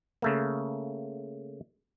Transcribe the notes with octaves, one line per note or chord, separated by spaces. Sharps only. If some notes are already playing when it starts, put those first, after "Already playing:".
C#3 A3 A#3